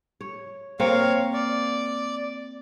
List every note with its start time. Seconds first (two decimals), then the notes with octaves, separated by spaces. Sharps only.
0.21 C#5
0.79 A#3 C4 C#5 F5
1.33 D5